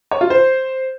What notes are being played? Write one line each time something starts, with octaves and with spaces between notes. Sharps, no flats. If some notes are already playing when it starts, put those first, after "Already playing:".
C#5
F4
C5